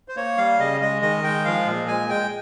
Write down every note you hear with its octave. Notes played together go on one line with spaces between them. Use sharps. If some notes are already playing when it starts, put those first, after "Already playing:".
C5
A#3 C#5
G3 F5
C#3 D#5
G#3 D#5
D#3 D#5
G#3 G5
F3 F5
A#2
G#3 G#5
G#3 G5